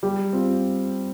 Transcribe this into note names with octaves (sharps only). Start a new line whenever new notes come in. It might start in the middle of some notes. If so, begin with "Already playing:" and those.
G3 G4
C4 F4